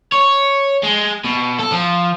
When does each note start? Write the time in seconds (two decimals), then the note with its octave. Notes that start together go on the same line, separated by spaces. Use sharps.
0.12 C#5
0.84 G#3
1.25 B2
1.59 A4
1.72 F3